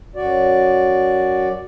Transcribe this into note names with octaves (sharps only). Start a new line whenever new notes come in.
F#2 F#4 D5